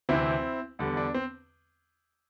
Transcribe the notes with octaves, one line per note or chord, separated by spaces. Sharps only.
D2 C3 E3 C4 E4
E2 D3 G3
D4
C4